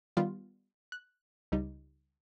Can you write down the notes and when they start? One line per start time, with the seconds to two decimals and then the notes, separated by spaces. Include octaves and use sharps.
0.17 D#3 G3 B3 F4
0.92 F#6
1.52 C#2 G3 D#4